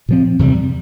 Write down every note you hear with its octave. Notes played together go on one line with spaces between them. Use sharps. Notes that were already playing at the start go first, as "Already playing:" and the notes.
A#2 F3 C4
E2 C3 G3